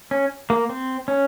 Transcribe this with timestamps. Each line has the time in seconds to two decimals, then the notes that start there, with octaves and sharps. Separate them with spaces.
0.11 C#4
0.50 A#3
0.69 C4
1.08 C#4